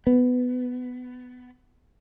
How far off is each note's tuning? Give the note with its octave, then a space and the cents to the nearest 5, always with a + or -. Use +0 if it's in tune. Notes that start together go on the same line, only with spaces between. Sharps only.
B3 +15